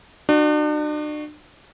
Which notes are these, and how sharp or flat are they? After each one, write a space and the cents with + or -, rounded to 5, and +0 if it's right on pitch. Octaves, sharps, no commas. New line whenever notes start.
D4 +40 F#4 +0